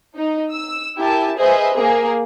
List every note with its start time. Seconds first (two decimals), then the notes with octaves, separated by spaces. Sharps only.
0.16 D#4
0.52 E6
0.98 E4 G4 A#4 E5 G#5 A5
1.39 G#4 B4 C5 D#5 E5 G#5
1.75 A#3 G#4